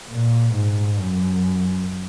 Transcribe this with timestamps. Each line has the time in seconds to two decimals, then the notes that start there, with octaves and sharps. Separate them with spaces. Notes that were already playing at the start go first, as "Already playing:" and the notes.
0.10 A#2
0.54 G#2
0.98 F#2